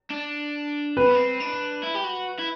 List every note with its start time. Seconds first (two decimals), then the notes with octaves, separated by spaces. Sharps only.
0.11 D4
0.97 C4 B4
1.07 B3
1.15 C4
1.40 D4
1.83 E4
1.95 G4
2.04 F#4
2.39 E4